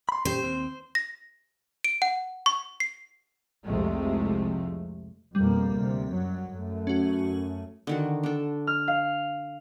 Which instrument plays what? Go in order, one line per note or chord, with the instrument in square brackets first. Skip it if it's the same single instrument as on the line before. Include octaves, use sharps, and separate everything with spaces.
[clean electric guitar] B5 C6
[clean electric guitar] A#2 C#4 G4 [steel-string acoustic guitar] C5
[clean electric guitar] D#2 C4
[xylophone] A#6
D7
F#5
C#6
C7
[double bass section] C2 F2 C3 F3 G#3 A3
[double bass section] F2 B2 A#3 [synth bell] G3
[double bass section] D2 C3
F#2 F#3
F#2 A3
[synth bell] C#4 F#4
[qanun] D3 D#3 F#4
D4 A4
[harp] F6
F5